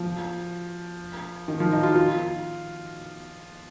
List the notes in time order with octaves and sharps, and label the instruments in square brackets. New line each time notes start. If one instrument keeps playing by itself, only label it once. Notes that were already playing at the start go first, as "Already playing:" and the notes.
Already playing: [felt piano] F3
D#3
F3
D#4
F4
F4